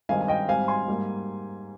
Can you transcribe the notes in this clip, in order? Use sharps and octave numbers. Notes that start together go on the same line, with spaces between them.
G2 D#3 G#3 C4 F5 G#5
G#5
D#5 G5
G#2 G3 C4 F5 G#5
G#5 C6
G#2 G3 A#3